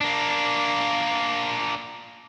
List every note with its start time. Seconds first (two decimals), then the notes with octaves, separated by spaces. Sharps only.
0.01 A#3 D4